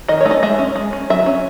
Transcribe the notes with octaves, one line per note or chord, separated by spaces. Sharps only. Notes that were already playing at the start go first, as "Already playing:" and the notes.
D#3 D#5
C#5
A3 D#4
D#5
G#3 E5
C#4
G#3
C#4
F#3 E5
C#4